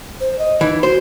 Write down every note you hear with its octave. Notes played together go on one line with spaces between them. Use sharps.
C5
D#5
E3 D#4
F#4 C5